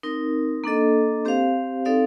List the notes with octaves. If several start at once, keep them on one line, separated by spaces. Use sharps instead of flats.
C4 D#4 A#4
A#3 D4 A4 D#5
C4 G4 C5 F5
C4 D#4 A4 D5 F5